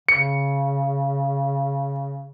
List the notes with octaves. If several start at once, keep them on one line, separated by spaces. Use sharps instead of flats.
C#3 C#7